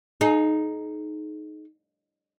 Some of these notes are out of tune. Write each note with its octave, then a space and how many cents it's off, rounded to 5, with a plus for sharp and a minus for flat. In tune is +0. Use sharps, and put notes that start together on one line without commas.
D#4 -5 G#4 +40